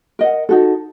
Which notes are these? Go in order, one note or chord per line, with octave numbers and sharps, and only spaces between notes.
A#4 D#5 F#5
D#4 F#4 A4